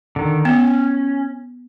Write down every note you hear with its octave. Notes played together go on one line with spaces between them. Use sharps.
D3 D#3
B3 C#4